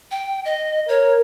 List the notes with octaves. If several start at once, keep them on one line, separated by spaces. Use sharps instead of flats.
G5
D#5
A#4 C#5